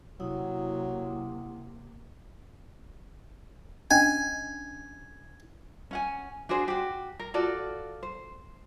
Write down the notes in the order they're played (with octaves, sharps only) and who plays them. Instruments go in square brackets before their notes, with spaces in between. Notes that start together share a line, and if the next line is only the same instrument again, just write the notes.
[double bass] C3 A#3 [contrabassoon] F#3 [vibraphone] E4 F#5 D#6
[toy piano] C#4 D4 D#5 [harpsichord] G#5
[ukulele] C#4 F#5 G#5
D4 F#4 G#4 C5
F#4 G4
A#4
F4 F#4 A4 D5
C5